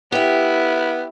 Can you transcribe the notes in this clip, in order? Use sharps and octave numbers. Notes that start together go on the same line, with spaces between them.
B3 E4 G4 E5